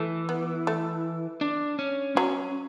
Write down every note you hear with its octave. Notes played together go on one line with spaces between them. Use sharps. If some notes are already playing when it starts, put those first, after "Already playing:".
Already playing: E3 A3
B3
A3
D4
C#4
F#3 C#4